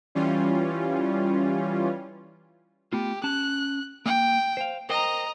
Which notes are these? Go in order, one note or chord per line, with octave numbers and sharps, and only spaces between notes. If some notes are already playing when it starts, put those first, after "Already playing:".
E3 G3 C#4 F4
A3 B3 F4 G4
C#4 A5 F#6
A#3 G5
C5 F5
A#4 C5 D#5 G5 A#5